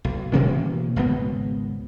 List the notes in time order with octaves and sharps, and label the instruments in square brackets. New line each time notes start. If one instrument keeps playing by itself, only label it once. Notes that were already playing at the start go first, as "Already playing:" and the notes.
[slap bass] B1
B2 E3 A#3 C#4
G#1 C#2 B2 B3